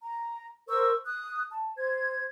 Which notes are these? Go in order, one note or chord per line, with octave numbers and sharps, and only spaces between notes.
A#5
A#4 C5 C#6 E6
D#6 F#6
A5
C5 G#6